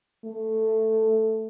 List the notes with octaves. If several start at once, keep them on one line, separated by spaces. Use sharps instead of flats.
A3